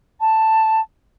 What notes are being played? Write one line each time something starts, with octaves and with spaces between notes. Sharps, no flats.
A5